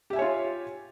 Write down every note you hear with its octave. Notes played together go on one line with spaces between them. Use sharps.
F4 G4 C#5 E5 G#5